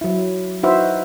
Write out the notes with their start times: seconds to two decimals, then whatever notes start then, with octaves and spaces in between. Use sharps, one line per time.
0.01 F#3 E4
0.63 D#4 E4 F#4 B4 C5 E5